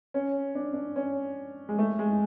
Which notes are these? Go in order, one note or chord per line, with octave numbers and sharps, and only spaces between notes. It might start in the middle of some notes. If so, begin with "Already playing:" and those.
C#4
D4
D4
C#4
G#3
A3
G#3